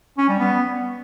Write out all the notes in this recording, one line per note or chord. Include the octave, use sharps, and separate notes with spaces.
C#4
G3
B3